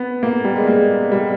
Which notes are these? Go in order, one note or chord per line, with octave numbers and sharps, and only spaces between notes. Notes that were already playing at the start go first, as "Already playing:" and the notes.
Already playing: B3
A#3
G3
G#3
A#3
G3